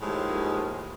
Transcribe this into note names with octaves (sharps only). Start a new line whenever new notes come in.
D#2 A2 F3 G#3